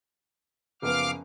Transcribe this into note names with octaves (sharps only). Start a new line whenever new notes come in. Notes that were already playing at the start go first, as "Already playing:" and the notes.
F#1 F3 B3 F5 D6 F6